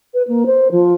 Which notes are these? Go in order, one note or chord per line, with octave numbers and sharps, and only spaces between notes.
B4
A#3
C5
F3